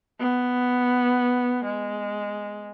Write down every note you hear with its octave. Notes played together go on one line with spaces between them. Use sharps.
B3
G#3